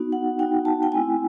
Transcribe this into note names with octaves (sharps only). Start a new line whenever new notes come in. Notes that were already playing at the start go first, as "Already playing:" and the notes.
Already playing: B3 D#4 F#4
F#5
B3 D#4 F#4 G5
A5
G5
A3 C4 E4 G#5